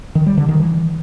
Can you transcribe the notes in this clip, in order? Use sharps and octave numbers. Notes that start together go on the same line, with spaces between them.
D#3
G3
D3
D#3
E3